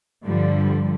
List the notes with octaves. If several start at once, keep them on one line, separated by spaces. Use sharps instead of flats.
G2 D3 F3 G3